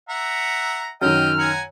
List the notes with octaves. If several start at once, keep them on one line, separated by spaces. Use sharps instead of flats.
E5 F#5 A#5
F#2 D#3 D#5 G5 F6
F#5 G#5 A#5